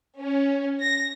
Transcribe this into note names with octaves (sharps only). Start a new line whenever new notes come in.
C#4
A#6